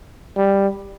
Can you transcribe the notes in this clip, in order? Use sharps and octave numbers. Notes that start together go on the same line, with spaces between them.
G3